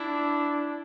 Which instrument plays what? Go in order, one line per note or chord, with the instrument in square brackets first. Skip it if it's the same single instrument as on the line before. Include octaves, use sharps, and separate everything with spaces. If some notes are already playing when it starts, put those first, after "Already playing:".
Already playing: [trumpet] D4 [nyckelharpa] E4